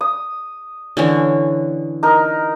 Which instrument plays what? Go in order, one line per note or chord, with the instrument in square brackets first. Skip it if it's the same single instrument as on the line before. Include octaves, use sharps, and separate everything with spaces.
[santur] D#6
[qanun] D3 E3 C#4
[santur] D#4 A#4